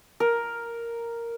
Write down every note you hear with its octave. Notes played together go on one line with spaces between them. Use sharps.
A#4